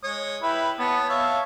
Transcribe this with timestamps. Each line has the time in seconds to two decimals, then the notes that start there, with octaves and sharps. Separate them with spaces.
0.04 G#3 C#5 D#6
0.42 E4 G4 B4
0.79 B3 C#5 A5 D#6
1.09 C#5 E5 F5 A5